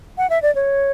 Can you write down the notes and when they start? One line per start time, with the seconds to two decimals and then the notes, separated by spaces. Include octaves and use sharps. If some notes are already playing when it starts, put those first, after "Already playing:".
0.18 F#5
0.30 E5
0.42 D5
0.55 C#5